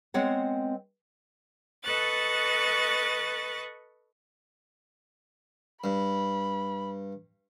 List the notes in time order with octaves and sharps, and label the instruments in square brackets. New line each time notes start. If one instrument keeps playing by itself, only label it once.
[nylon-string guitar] G#3 B3 C4 C#5 F#5
[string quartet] A4 B4 D#5 C#6 F#6 A6
[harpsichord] G2 [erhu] B5